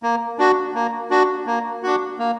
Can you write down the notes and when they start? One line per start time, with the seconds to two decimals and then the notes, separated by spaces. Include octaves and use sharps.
0.03 A#3
0.38 D4 F#4
0.74 A#3
1.10 D4 F#4
1.46 A#3
1.83 D4 F#4
2.19 A#3